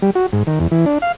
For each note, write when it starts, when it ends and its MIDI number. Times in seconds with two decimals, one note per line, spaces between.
0.02 0.10 55
0.15 0.26 66
0.33 0.43 44
0.47 0.59 51
0.60 0.67 40
0.71 0.85 52
0.86 0.98 62
1.02 1.12 77